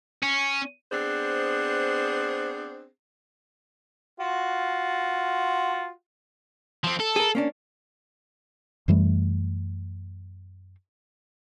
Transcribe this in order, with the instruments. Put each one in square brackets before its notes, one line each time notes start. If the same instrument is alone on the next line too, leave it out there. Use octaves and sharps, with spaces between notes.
[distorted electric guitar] C#4
[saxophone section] B3 C4 D4 G#4 C5
[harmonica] F4 F#4
[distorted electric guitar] F3 C4
A4
[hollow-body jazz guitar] G#4 A#4
A#3 C#4 D4
[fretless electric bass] F#2 E3 G3 A3